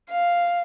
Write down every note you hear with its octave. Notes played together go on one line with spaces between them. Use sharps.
F5